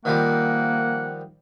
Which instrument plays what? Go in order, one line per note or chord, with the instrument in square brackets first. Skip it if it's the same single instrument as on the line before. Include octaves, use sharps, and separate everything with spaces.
[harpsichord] D#3 F3 G3 [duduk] A#3 [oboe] F#5